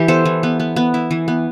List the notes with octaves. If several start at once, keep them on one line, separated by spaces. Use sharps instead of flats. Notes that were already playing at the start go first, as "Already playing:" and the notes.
Already playing: E3 G4
B3 A4 C5
E3
B3
B3
B3
E4
E3
B3